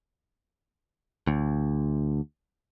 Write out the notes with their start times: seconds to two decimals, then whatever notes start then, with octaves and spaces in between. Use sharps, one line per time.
1.27 D2